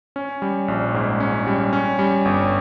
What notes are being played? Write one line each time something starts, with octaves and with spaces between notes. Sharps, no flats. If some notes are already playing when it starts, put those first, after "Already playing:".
C#4
G3
A#1
G#2
C#4
G3
C#4
G3
G1